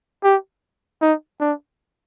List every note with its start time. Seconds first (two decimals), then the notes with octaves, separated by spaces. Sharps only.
0.24 G4
1.02 D#4
1.40 D4